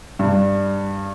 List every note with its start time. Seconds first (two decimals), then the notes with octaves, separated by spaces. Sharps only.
0.19 G2